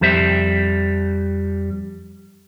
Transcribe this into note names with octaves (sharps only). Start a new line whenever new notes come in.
F2 G3 C5 E5